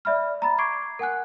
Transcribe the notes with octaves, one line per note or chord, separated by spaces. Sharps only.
D5 E5 B5 F6
A#5 B5 A6
C#6 D6 G#6 C7 D7
A#4 F#5 G#5 F#6